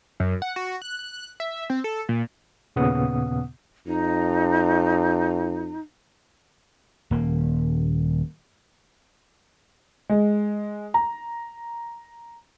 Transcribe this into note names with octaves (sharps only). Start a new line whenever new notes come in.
F#2
F#5
F#4
F#6
F#6
E5
C4
A4
A#2
D#2 A#2 C#3 B3 F#5 D#6
F2 D#4
D#1 A#3
G#3
A#5